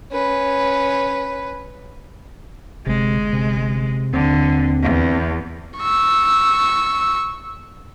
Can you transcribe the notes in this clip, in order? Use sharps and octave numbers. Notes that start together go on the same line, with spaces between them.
C#4 B4
G1 C3 G#3
C3
D#2 D3 C4
E2
C#6 E6